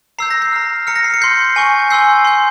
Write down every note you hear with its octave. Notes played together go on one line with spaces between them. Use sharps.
A#5 E6 G6 C7
A#6
C7
A#5 F6
A#5 F6 C#7
A#6
C7
C#7
C6 G6 C7
G#5 C#6 G6
G#5 C6 E6 G6 C7
C6 G6